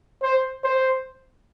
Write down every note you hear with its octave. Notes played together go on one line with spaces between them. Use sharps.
C5
C5